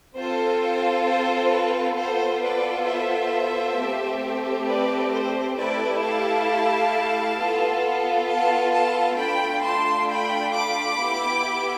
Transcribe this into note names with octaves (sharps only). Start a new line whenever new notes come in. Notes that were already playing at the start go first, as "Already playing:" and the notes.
C4 F4 A4 C5
C5
C5
B4
B3 F4 A4 C5
B4 D5
C5 E5
A3 C4 G4
B4 D5
C5
A3 E4 G4 B4 D5
F5 A5
B3 F4 A4
F5 A5
F5 A5
A3 D4 F4 G5 B5
A5 C6
G5 B5
B5 D6
B3 E4 G4